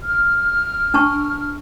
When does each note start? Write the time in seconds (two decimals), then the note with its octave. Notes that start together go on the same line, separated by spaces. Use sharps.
0.02 F6
0.94 D4 A5 C#6